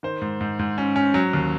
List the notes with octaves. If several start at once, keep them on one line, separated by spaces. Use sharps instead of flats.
D#3 C5
G#2
G#2
G#2
C#4
C#4
F#3
D#2